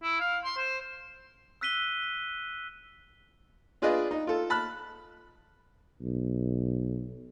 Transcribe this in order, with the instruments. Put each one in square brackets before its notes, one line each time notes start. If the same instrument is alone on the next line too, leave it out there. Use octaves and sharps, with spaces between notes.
[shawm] E4
F5
C6
C5
[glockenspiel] E6 F#6 B6 D#7 G7
[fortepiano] D4 F4 G#4 B4 D5 D#5
D#4
F4 A4
A5 B5 F6 F#6
[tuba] B1